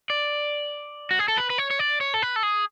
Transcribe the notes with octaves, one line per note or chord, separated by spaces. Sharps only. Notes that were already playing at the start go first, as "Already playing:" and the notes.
D5
F#4
G#4
A4
B4
B4
C#5
C#5
D5
C#5
A4
B4
A4
G#4